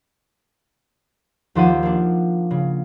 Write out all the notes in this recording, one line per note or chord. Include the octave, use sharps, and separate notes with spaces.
D#2 F3 C5 D5 F#5 D#7
A#3 D4
C#3